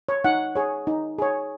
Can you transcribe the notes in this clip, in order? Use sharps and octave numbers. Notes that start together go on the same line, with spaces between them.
C#5
D#4 F#5
G#4 C#5
D#4
G#4 C#5